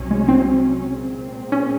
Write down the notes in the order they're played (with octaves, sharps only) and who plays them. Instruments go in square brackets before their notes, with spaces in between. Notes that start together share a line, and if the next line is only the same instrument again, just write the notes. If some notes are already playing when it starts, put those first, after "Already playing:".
Already playing: [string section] C2 C3 F#3 C#4
[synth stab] G#3
C4
[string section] A#2 G#3 C4
[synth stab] C#4